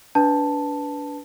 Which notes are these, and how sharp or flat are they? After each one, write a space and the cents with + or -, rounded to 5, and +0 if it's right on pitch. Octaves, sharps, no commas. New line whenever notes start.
D4 -25 B4 +0 A5 +0